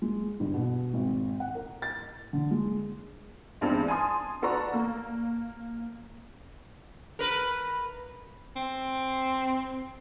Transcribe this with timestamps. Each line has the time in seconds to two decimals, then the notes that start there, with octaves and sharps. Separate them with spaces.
0.02 G#3
0.40 G1
0.54 B2
0.94 G#1
1.40 F#5
1.55 A#4
1.82 A6
2.33 D3
2.51 G#3
3.61 E2 G2 E3 G#3 C4 D4
3.88 G#5 A5 C6 D#6
4.42 F#4 A4 B4 D5 A#5 C#6
4.73 A#3
7.19 A#4 B4
8.56 C4